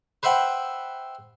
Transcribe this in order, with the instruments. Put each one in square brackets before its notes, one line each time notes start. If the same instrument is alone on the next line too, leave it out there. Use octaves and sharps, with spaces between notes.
[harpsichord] B4 C5 E5 F#5 G5